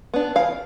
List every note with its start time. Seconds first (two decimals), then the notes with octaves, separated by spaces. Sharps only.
0.14 B3 D4
0.36 E3 F5